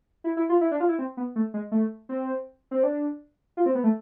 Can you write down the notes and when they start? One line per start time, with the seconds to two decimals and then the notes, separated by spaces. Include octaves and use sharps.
0.24 E4
0.37 E4
0.49 F4
0.61 E4
0.71 D4
0.80 F4
0.89 E4
0.99 C4
1.17 B3
1.36 A3
1.54 G#3
1.72 A3
2.09 C4
2.71 C4
2.83 D4
3.57 F4
3.66 C4
3.75 B3
3.84 A3